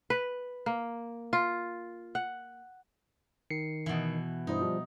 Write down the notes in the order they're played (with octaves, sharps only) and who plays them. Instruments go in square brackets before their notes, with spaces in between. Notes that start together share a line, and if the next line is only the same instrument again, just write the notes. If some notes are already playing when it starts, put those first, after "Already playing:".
[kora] B4
A#3
F4
F#5
[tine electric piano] D#3 C7 C#7
[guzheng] B2 E3
[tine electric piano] G2 E4 C5 [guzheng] D#4
[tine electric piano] F3 G3